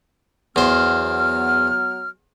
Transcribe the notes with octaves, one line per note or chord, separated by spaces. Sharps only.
E2 F#3 B3 C5 F6